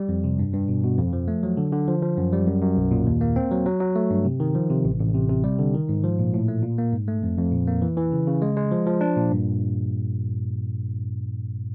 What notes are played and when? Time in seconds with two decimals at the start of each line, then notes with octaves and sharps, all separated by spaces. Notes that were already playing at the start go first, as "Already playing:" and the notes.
Already playing: G3
0.09 F2
0.24 C3
0.39 G2
0.54 G2
0.68 B2
0.84 B2
0.98 F2
1.13 F3
1.28 A3
1.43 F#3
1.57 D3
1.72 D3
1.88 F3
2.02 F3
2.17 F#2
2.32 G3
2.47 F#2
2.62 F#2
2.77 B1
2.91 A#2
3.07 D#2
3.21 A#3
3.36 C4
3.51 F#3
3.66 F#3
3.81 F#3
3.96 A3
4.10 G2
4.25 C3
4.40 D#3
4.55 F3
4.70 C3
4.85 A1
5.00 A1
5.15 C3
5.30 C3
5.44 G3
5.59 D3
5.74 D#3
5.89 G#2
6.04 F3
6.19 A#2
6.34 A2
6.48 A3
6.63 A#2
6.78 A#3
6.93 G#2
7.08 A3
7.23 F2
7.38 F2
7.52 A#2
7.68 A#3
7.82 E3
7.97 E3
8.12 C#3
8.27 C#3
8.42 G#3
8.57 G#3
8.71 F3
8.86 F3
9.01 D4
9.16 A#2
9.31 G2